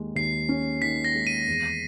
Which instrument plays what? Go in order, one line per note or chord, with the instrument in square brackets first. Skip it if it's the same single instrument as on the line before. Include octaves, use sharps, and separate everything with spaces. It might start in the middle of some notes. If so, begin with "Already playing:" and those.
Already playing: [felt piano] D#2 D#3 G#3
[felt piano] D#2 [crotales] C7
[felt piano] C#4
[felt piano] D#3 [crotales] B6
[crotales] A#6
[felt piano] G#3
[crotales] D#7
[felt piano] E2